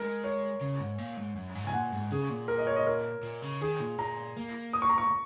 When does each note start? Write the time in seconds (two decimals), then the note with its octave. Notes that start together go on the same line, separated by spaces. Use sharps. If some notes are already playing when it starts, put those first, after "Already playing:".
Already playing: G#3 A#4
0.24 C#5
0.61 C#3
0.80 G#2
0.98 A#2
1.17 G#2
1.36 F#2
1.55 G#2
1.64 C#3 G#5
1.73 A#2 F#5
1.92 G#2
2.11 C#3 G#4
2.30 A#2
2.48 A#4
2.58 D#5
2.67 C#5
2.76 D#5
2.87 A#4
3.23 A#2
3.42 C#3
3.61 D#3 G#4
3.80 A#2
3.99 A#2 A#5
4.37 A#3
4.73 D#6
4.82 C#6
4.89 A#5
4.98 C#6